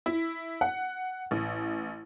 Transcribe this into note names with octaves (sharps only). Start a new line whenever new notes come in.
E4
F#5
A1